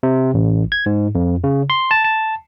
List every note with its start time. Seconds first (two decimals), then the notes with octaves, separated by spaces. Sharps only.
0.03 C3
0.34 A1
0.72 G#6
0.86 G#2
1.15 F2
1.44 C#3
1.70 C6
1.91 A5
2.04 A5